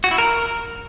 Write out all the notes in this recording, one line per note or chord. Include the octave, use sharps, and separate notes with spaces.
F#4
E4
A#4